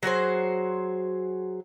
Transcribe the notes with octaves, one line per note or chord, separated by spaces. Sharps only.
F#3 F#4 G#4 C5